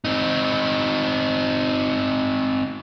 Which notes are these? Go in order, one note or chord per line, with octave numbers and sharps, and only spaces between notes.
C4 D#4